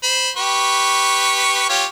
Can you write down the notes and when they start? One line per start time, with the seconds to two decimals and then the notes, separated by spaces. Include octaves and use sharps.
0.03 C5 B5
0.37 G4 B4 C#6
1.69 F4 G4 C#5